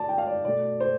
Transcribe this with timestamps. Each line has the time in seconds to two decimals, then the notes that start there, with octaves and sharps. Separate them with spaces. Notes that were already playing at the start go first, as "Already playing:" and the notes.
Already playing: A3 D5 A5
0.09 G5
0.18 F5
0.27 D5
0.45 B2 A3 D5
0.80 C5